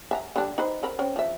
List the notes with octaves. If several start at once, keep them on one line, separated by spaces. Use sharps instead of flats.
E5 A5 A#5
D3 G3 D4
D#4 B4 C5
C4 A#4 B5
C4 C#4
F3 E5